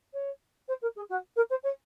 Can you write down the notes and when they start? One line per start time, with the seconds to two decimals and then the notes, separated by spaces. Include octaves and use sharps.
0.13 C#5
0.67 C5
0.81 A#4
0.95 G#4
1.09 F#4
1.35 A#4
1.49 C5
1.63 C#5